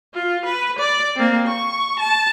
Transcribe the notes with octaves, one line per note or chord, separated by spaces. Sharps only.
F4
B4
D5
A#3 C4
C#6
A5